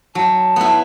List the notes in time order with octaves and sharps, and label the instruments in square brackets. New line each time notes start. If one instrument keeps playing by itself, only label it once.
[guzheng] F#3 [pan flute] A5
[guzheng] B3 E4